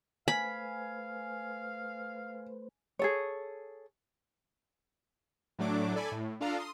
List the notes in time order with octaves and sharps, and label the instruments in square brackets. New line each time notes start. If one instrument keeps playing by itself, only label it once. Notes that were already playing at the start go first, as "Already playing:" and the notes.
[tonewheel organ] A3 B4 C5 [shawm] F5 [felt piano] G#5 [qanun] B5
[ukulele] G#4 A4 C#5
[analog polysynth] A2 F#3 A3 D4 D6
A4 D5 G#5 B5
A2
D4 F4 A4 F5 A#5
C6 D#6